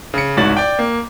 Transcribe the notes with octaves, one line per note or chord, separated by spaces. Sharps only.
C#3 C#7
C2 G#2 F#4 C#5 A6 F#7
D5 G5
A#3